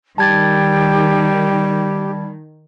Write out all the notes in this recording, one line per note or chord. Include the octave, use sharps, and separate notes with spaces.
D#3 G3 G4 A5 G#6 A6